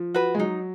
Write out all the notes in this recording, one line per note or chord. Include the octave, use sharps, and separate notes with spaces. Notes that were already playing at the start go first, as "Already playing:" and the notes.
Already playing: F3
F#4 B4
G#3
F#3 D#4